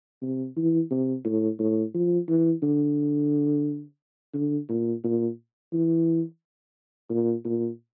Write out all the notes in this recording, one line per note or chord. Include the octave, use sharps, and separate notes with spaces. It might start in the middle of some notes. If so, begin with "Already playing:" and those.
C3
E3
C3
A2
A2
F3
E3
D3
D3
A#2
A#2
E3
A#2
A#2